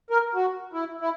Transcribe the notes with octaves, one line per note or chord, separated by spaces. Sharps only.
A#4
F#4
E4
E4